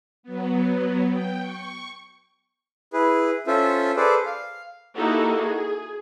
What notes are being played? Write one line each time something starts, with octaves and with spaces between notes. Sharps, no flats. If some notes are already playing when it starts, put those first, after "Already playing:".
F#3 B3
G5
C#6
E4 G#4 B4
C#4 F4 A4 C5 E5
G#4 A4 B4 C5 D5
F5
A#3 D#4 E4 F#4 G4 A4
G#4